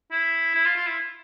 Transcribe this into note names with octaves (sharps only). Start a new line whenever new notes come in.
E4
E4
F4
F4
E4